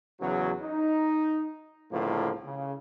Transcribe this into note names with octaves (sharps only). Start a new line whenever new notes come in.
E2 C#3 F#3
D#4
C#2 A2 D3 F3 A#3
C#3